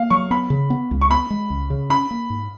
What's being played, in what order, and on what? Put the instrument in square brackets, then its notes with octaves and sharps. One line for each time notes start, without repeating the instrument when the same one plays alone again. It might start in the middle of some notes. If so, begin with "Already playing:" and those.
Already playing: [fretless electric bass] A#3 [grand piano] F5
[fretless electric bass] F#3 [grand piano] C#6
[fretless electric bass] B3 [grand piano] B5
[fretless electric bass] C#3
B3
C#2
[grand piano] C#6
[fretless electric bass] B3 [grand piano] B5
[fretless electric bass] G#3
C#2
C#3
[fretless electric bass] C#4 [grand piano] B5
[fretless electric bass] A#3
G#2